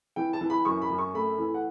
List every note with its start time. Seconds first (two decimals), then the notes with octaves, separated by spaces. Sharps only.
0.16 E3 G5
0.33 A5
0.41 E3
0.50 B5
0.65 F#2 C#6
0.82 B5
0.90 F#2
0.98 C#6
1.14 A3 B5
1.39 E3
1.54 F#5